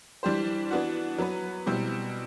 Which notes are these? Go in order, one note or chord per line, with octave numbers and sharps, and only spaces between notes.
E3 G3 D4 G4 C5
E3 B3 D4 F#4
F#3 B3 F#4 B4
B2 G3 C4 E4